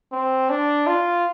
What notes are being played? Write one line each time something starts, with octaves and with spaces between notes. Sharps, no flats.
C4
D4
F4